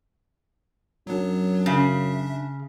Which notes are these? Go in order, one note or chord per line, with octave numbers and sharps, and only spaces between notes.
F#2 F#3 B3 D4
C#3 D4 E5